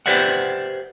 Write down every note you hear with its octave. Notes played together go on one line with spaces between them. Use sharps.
G4 B4 C5 D5 E5 F#5